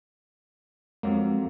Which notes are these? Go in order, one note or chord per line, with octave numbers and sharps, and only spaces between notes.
F2 F#3 G#3 A#3